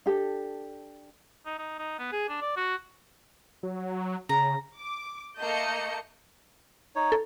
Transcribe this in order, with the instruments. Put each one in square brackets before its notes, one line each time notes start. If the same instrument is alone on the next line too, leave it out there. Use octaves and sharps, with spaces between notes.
[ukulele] D4 G4 A4
[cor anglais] D#4
D#4
D#4
B3
G#4
D4
D5
F#4
[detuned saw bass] F#3
[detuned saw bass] C#3 [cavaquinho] A#5
[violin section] D6
A3 A#3 D#5 A5 G6 C#7
[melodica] D#4 C#5
[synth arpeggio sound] A4